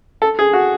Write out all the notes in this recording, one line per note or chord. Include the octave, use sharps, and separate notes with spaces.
A4
G#4
F#4